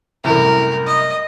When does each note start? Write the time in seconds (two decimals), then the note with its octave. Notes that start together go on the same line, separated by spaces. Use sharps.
0.24 C2 F#2 A2 A#4
0.87 D#5